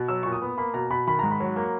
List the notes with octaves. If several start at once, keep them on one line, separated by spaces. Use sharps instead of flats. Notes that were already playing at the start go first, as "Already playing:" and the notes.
Already playing: B2
F#3 E6
A#2 C#6
D#6
B3
A#3 B5
B2 A#5
B2 B5
D#3 B5
G#2 A#5
B5
F#3
A#3